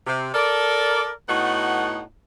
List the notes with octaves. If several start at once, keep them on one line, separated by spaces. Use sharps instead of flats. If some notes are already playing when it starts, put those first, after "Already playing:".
C3
A4 A#4 D5
A2 A3 B3 D#4 F#4 F#5